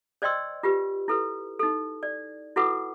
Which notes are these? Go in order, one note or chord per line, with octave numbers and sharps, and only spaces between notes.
C5 D5 D#5 G5 C6 E6
F4 G4 B4
E4 A4 B4
D#4 A4
D5
E4 F#4 A4 B4 F#5 D6